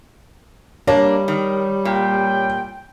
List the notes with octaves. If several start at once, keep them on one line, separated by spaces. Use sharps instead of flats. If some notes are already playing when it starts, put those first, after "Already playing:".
G3 A#3 D4 C#5
D#3
A#2 G5